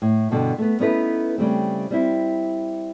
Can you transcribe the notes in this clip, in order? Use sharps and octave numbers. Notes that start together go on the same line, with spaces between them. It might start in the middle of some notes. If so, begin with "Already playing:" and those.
A2
G2 B2 D3
A3 B3
B3 C#4 D#4 E4 A4 B4
C#3 G3 A3 C4
G3 C4 E4